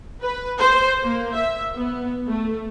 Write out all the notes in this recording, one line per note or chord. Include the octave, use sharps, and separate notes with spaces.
B4
C5
A#3
E5
B3
A3